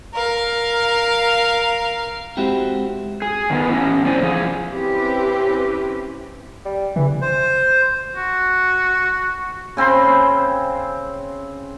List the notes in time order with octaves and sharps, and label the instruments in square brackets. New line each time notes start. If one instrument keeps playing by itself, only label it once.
[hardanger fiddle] A#4 F5
[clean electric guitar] G#3 C4 E4 F#4 G4
[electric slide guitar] G#4
D#3 A#3 B3
E3 C#4
C4 C#4 C5 D5 G#5
F3 G#4
[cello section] C4 C#4 E4 G4 B4
[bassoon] G3
[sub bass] C#3 [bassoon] E3
[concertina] C5
[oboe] F#4
[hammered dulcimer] C#3 C4 B5 C6